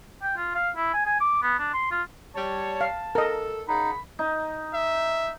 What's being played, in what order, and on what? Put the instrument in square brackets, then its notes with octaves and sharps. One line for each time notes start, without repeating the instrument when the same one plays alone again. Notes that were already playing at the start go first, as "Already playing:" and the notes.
[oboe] G5
F4
F5
E4
G#5
G#5
D6
B3
D4
C6
F4
[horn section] G3 C#5 [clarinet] A5
[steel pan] F5
[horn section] A4 [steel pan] A#4 D#5
[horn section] C#3 F#5 [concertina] D#4 [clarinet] B5
[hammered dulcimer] D#4
[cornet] E5